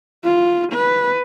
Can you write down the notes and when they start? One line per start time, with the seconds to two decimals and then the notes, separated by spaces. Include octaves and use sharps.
0.24 F4
0.72 B4